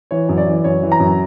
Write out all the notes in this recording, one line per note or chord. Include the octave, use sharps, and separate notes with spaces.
E3 C#5
F#2
D5
E3
F#2 C#5
E3
A#5
F#2